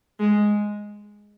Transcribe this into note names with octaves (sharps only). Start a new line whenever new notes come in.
G#3